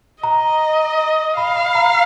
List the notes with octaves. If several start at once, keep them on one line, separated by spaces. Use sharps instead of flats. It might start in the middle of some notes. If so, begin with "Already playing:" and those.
D#5 A#5
F5 B5
B5
A#5